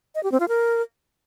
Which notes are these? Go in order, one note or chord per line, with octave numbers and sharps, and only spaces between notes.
D#5
G4
C4
F4
A#4